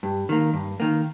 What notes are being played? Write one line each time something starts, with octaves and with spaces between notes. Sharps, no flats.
G2
D#3 A#3
G2
D#3 A#3